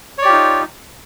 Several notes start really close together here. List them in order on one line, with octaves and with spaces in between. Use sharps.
C#5 D5 G4 F4 D#4